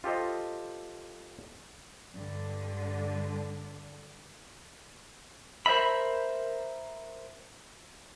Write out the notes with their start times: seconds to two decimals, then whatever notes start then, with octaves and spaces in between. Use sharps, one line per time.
0.04 F4 G4 A4 C5 D#5
2.13 G2 D3
5.66 A#4 C5 D#5 E5 B5